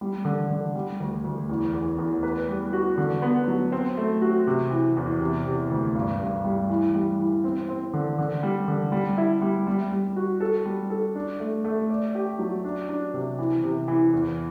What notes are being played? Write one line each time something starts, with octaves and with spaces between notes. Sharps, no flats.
G3
D3
D3
G3
D2
D2
E2
E2
E2
B4
G3
F#4
D3
B3
F#3
C4
A3
F#4
C3
E3
E2
C3
C3
D2
G2
G2
G3
E3
G3
E3
C4
C4
D3
D3
G3
D3
G3
E4
G3
G3
G3
F#4
A4
G3
A4
D4
A3
A3
D5
G4
F#3
D4
D4
C3
E3
C3
E3
E2